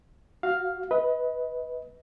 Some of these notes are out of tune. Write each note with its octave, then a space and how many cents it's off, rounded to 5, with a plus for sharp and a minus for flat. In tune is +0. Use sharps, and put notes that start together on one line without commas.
F#4 -5 F5 +5
B4 +0 D#5 +30